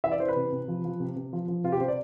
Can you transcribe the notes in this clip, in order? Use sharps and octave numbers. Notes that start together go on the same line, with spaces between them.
E3 E5
D5
E3 C5
B4
C3
C3
F3
F3
C3
C3
F3
F3
C3 F4
G4
C3 C5
D5